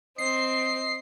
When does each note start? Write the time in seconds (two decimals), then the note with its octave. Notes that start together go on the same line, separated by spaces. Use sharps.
0.18 C4 D#5 C7